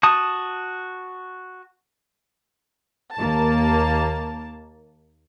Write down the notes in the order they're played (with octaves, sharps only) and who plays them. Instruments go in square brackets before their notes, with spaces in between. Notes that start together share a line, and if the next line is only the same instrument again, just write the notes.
[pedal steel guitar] F#4 A5 D#6
[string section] D#2 A#3 A5